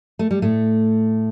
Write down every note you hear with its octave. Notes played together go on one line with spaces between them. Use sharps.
A3
G3
A2 A3